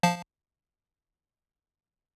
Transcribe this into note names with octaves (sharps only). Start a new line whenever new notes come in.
F3 F5 A5